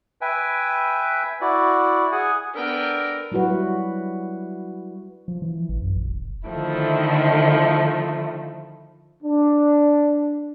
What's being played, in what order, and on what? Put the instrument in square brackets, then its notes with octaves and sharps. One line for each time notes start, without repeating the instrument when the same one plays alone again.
[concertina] B4 E5 G5 G#5
E4 F#4 D5
G#4 F#5 G#5
[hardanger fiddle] B3 G5 [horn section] D4 A4 A#4
[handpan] F#3 G3 E4 F#4 B4
[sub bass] F3
E3
A1
F#2
A#1
E1
[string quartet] D3 D#3 F3 A3 E4
[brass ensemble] D4